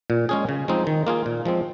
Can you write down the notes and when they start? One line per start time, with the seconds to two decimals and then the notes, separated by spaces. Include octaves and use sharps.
0.10 A#2
0.29 G#3 C#4 G#4
0.49 C#3
0.68 F3 G#3 C4 D#4
0.87 D#3
1.07 A#3 F4 G#4
1.26 A#2
1.45 F3 G#3 C4